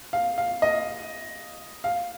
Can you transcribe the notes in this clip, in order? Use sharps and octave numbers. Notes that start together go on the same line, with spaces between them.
F5
F5
D#5
F5